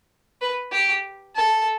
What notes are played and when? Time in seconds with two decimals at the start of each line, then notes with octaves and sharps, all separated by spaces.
0.42 B4
0.72 G4
1.36 A4